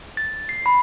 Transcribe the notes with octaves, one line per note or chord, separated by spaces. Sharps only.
A6
C7
B5